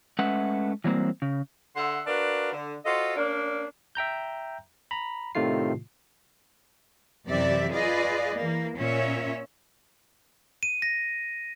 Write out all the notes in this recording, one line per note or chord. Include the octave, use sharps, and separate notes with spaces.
G#3 A3 C#4 B4 E5 F#5
E3 F#3 G3 A#3 C4
C#3
D3 E5 F#5 C6
D4 F#4 A#4 B4 F5
D3
F4 F#4 A4 C5 D#5
A#3 C#4 D4
E5 G5 A#5 G6
A#5 B5
A2 C3 D#3 A3 F4 C7
F#2 C3 E3 G4 D5 E5
F4 G#4 B4 D5 D#5
E3 A#3
A#2 C#4 C#5 E5
D#7
A#6